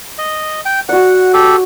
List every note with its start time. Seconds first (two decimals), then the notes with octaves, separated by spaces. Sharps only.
0.18 D#5
0.65 G5
0.89 F#4 D5 F#5
1.33 G4 A4